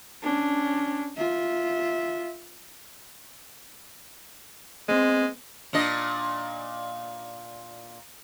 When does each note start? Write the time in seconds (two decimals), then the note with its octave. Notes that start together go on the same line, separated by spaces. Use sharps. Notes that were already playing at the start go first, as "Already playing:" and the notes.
0.23 C#4 D4
1.17 F4 E5
4.89 G#3 B3 C4
5.73 A#2 D4 D#5